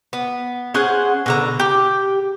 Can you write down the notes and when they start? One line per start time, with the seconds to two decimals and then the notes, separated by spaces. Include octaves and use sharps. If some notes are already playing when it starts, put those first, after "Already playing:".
0.13 B3
0.74 C#4 G#4 C5 F#5
1.26 B2 D3 A#5
1.60 G4